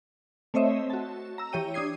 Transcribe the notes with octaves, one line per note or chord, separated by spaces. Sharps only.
A3 C4 C5 C#5 D#5 E5
F#4 A5
A#5 E6
E3 G4 C#5 G5 D#7
D4 D#6 G#6 C7